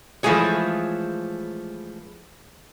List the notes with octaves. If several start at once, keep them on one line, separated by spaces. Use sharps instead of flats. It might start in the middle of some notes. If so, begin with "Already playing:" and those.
E3 F3 G#3 A3 G#4 C#5